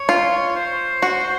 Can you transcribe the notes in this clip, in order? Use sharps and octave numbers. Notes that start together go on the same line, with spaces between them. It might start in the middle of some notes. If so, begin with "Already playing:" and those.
Already playing: C#5
F4
C5
F#4